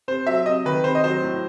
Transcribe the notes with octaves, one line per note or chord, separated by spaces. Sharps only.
C3 C5
F#3 E5
C3 D#5
D#3 B4
C3 C5
D#5
F#3 C5
A2